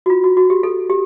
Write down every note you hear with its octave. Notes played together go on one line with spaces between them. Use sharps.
F#4
F4
F#4
F#4
G4
A4
G4